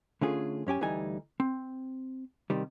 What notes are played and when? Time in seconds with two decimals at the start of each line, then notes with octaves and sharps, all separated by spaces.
0.21 D3 A3 C#4 F4 G#4
0.67 F#2 C#4 G4 G#5
0.81 D2 E3 G3 D#4 G#5
1.40 C4
2.50 C3 D#3 G3